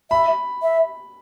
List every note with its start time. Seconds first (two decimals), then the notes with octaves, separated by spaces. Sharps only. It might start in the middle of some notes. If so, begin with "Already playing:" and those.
0.11 E5 B5
0.62 E5